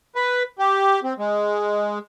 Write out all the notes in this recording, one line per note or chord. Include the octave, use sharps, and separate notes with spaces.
B4
G4
C4
G#3